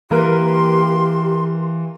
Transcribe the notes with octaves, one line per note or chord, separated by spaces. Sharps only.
E3 A#3 G4 A#4 B4 C6